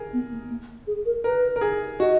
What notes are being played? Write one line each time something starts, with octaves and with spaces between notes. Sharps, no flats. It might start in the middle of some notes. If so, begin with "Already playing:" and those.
Already playing: G#4 A#4
B3
A#3
A#3
G#4
A#4
A#4 B4
A#4
G#4
F#4 D#5